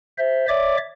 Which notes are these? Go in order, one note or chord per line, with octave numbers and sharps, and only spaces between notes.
C5 E5
C#5 D5 E5 D6